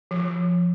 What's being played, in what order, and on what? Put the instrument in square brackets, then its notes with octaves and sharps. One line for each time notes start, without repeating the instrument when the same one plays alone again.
[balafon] F3